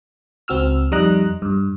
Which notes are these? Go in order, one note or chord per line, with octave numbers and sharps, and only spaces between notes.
C#2 C4 F#4 E6 F6
F2 G3 D#4 D#5 A#5 F#6
G2